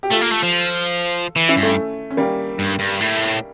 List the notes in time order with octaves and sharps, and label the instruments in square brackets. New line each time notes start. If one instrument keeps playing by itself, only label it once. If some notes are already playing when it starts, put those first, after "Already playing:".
[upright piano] G4
[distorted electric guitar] A3 [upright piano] F4 A4
[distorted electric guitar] A#3
A3
F3
E3
[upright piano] C#4 E4
[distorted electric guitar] G2
[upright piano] A3 C#4
C#4
G3 A#3
[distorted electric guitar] G2
G2
A2